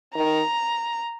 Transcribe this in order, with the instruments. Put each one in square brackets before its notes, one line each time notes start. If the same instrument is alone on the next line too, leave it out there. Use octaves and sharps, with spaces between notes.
[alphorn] D#3 [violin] A#5